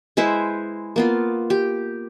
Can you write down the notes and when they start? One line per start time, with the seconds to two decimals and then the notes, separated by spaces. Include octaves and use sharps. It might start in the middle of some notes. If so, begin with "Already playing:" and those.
0.17 G#3 E4 B4 C5
0.96 A#3 B3 F4
1.50 G4